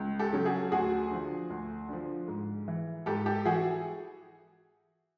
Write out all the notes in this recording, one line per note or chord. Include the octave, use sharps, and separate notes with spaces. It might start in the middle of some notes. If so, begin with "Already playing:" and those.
Already playing: C#2
G4 A4
C#3 F#3
F#4 G#4
D2 F#4 G#4
D3 F3
D2
D3 F3
G#2
E3
G#2 G4 A4
G4 A4
E3 F#4 G#4